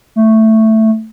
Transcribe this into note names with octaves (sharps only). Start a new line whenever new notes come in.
A3